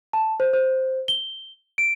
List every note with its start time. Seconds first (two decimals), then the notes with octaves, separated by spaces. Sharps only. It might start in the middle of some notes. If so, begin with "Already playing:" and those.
0.13 A5
0.40 C5
0.53 C5
1.08 G7
1.78 D7